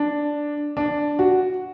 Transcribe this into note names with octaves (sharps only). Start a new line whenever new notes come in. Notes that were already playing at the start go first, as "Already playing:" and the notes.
Already playing: D4
D4
F#4